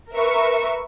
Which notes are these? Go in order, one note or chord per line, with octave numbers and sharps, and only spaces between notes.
A#4 B4 E5 C#6